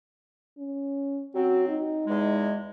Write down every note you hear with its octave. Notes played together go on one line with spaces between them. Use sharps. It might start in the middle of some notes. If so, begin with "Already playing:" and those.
C#4
F#3 C4 F#4
D#4
E2 G#3